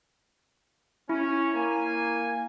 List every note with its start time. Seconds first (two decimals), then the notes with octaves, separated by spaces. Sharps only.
1.09 C#4 E4
1.55 A#3 G#5